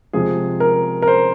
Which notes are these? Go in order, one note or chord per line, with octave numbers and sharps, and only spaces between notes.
C3 F3 G#3 G#4
A#4
A#4
C5